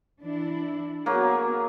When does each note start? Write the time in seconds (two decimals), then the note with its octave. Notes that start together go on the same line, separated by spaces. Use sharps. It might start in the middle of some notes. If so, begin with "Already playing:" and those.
0.21 E3 D4 E4
1.06 F#3 A#3 B3 G#4